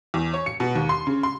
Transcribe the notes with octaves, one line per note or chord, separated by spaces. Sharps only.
E2
C#5
C#7
B2
D#2
C6
C#3
C6